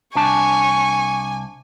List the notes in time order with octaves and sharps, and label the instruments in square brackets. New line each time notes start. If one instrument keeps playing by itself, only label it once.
[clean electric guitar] C2 D4 A5 [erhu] G#5 [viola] C#6